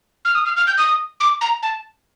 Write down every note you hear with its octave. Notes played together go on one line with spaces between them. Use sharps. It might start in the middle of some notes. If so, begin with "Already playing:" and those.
F6
D#6
F6
F6
G6
D#6
D6
A#5
A5